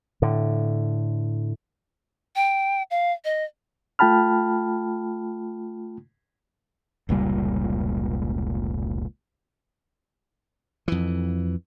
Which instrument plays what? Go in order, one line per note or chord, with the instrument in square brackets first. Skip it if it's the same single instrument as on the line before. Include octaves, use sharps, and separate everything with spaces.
[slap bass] A2 D3
[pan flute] G5
F5
D#5
[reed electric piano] A3 F4 G5 A5 B5 F6
[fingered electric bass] F1 C#2 A#2 G3
[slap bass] F2 E3